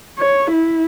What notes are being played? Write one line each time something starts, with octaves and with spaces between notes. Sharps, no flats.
C#5
E4